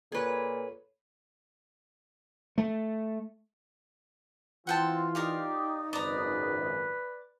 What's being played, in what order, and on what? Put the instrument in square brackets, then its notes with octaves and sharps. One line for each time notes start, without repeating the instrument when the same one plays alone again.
[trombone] A#2 [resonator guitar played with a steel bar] G#4 B4 [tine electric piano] A4 C#5
[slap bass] A3
[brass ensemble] E3 F4 [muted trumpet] C4 [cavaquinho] F#5 G5 A5
[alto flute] D#4 [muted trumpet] G4 [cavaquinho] A#4 D5 F5
[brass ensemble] G#1 C#2 F#2 [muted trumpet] B4 [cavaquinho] D5 A#5